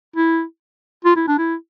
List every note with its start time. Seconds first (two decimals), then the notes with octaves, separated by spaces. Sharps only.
0.16 E4
1.05 F4
1.16 E4
1.28 D4
1.38 E4